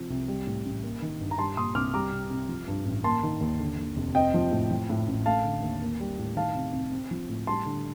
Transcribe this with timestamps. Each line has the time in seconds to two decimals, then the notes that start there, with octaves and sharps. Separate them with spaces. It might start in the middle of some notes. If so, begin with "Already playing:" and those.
Already playing: C3 F3
0.10 C2
0.28 G3
0.47 A2
0.65 A1
0.83 A#3
1.02 D#3
1.21 G2
1.31 A#5
1.38 G3 A5 C6
1.57 A#2 C6 D#6
1.75 C2 D6 F6
1.94 G3 A#5 D6
2.12 C3
2.30 C2
2.49 F3
2.68 G2
2.85 A1
3.04 A#3 A5 C6
3.23 D#3
3.41 D#2
3.59 D3
3.78 D#2
3.96 F1
4.15 C4 D#5 G5
4.34 F3
4.51 A2
4.71 F3
4.90 A2
5.08 A1
5.26 A3 F5 A5
5.44 D3
5.62 D#2
5.82 A#3
6.00 G3
6.18 A2
6.36 D#3 F5 A5
6.54 C3
6.73 C2
6.92 C4
7.11 F3
7.29 A2
7.47 G3 A5 C6
7.65 D3